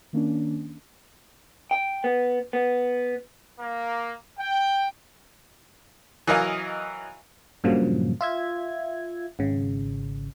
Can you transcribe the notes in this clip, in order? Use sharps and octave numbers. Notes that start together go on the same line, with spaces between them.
D#3 A#3 C#4 D4
G5
B3
B3
A#3
G5
E3 F#3 A#4 D#5 F5 G#5
G2 A#2 C#3 F3 F#3
F4 E5 G#6
G#1 C#3